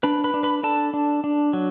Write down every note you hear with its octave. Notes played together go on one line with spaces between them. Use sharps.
D4 B4 B5
B4 B5
D4
B4 B5
D4 A4 A5
D4
D4
F#3